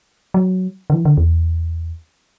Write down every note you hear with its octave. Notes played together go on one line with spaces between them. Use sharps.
F#3
D3
E3
D3
E2